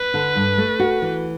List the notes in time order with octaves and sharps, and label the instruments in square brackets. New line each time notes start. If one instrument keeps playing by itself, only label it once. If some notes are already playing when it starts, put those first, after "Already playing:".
Already playing: [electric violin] B4
[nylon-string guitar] D3
G2
A3
F#4
E3